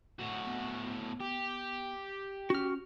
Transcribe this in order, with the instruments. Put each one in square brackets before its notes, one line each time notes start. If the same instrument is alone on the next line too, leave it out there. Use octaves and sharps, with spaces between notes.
[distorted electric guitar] A2 F#4
[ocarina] B3
[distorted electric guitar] G4
[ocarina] C#4 [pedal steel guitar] F#4 F6